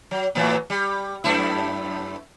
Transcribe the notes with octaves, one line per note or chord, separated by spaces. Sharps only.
F#3
A2 E3 F#3
G3
F#2 A3 E4